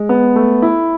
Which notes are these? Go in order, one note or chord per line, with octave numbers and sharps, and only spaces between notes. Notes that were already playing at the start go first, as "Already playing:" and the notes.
Already playing: G#3
B3
A3
E4